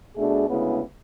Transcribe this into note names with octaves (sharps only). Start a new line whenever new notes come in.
B2 A3 D4 G#4
D2 C#3 G#3 B3 E4